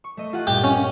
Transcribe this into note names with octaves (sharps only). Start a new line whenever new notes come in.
C#6
A3 D#5
F4 G4 F#5
G2 A#2 G4 G5
C#4